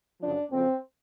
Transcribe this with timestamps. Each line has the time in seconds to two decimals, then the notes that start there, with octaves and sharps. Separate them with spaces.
0.20 F#2 C#3 F3 D4
0.51 F2 C#3 F3 C4